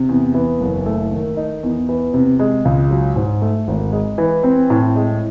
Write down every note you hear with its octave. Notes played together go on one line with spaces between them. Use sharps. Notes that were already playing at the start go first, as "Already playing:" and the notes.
Already playing: C3
E2
E3
F#1
A3
D#3
D#4
E2
E3
C3
G#3
C#2
F#3
G#2
A3
G#1
G#3
E3
C4
A2
G#3